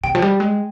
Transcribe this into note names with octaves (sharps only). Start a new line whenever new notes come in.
C3 G5
F3
G3
G#3